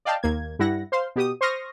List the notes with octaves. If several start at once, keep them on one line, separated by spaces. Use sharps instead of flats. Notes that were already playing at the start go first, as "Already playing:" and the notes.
D5 D#5 F5 G5 A5
D#2 A#3 G#6
G2 G3 E4 F#5 A#6
C5 F5 C6
B2 G4 D#6
C5 C6 C#6 D#6 F6 A#6